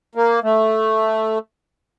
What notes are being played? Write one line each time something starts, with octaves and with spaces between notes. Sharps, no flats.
A#3
A3